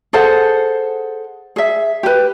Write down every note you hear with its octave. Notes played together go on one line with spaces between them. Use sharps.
G#4 A4 C5 F#5
G#4 E5
G4 B4